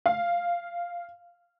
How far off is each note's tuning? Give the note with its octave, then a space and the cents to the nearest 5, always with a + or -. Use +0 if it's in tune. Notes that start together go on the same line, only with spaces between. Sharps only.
F5 -5